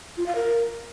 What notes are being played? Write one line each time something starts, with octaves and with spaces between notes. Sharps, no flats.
F4
F5
A#4